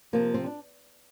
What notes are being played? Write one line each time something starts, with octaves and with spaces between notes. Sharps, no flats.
C3 F3 A#3
C4
D4